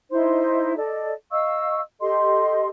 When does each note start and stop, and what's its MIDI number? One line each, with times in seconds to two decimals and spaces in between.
0.11 0.76 63
0.11 0.76 64
0.11 0.76 72
0.11 0.76 84
0.76 1.12 69
0.76 1.12 74
0.76 1.12 75
1.32 1.80 75
1.32 1.80 77
1.32 1.80 85
1.32 1.80 88
2.01 2.68 67
2.01 2.68 69
2.01 2.68 75
2.01 2.68 84